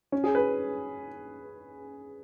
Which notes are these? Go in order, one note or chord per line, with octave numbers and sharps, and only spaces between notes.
C#4
G#4
B4